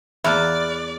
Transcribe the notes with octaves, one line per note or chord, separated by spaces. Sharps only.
E2 A#3 D5 E5 B5 F6 F#6